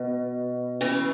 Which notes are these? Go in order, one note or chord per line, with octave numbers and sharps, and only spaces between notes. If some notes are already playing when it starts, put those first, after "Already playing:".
Already playing: B2
C#3 E3